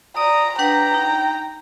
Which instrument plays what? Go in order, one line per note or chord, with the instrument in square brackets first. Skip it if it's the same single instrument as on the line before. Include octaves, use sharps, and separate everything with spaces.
[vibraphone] D5 [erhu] A#5 [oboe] D#6
[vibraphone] D4 B4 F#5 [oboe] G5 [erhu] A#5
[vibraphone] D#4